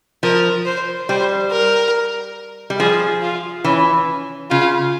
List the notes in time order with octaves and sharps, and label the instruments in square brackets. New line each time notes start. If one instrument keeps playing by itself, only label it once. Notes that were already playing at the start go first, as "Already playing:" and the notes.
[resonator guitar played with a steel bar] F3 [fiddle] A#4
[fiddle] C5
[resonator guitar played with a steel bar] G3 [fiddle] C5
[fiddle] A#4
[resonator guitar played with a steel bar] G3
[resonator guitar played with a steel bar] F3 [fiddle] G#4
[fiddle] F4
[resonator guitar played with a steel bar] E3 [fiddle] C#4
[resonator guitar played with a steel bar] C#3 [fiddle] F4